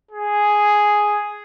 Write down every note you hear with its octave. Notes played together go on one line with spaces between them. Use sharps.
G#4